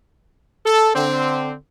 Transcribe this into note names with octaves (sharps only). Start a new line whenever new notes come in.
A4
D3 C4